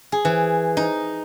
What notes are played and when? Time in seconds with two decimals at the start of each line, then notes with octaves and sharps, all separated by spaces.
0.12 G#4
0.25 E3
0.77 D#4